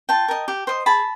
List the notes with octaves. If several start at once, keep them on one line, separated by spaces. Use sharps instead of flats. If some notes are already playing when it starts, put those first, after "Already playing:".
F4 G5 A5
A#4 D#5
G4
C5 D#5
G#4 A5 B5